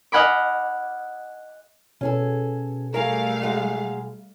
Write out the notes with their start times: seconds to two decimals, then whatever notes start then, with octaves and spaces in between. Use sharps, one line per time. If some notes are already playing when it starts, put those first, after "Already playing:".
0.12 D#5 F5 F#5 G#5 B5 D6
2.01 B2 C#4 G#4 A4
2.94 G3 A3 G#4 A#4 F5
3.42 F#3 G#3 G#4